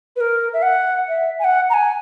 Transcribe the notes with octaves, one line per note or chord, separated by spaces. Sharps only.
B4
A#4
E5
F#5
E5
G#5
F#5
A#5
G#5